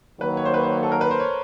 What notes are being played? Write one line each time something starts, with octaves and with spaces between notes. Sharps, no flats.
D#3 F#3 A#3 B4
C#5
C5
B4
C5
A4
A#4
B4
C5
C#5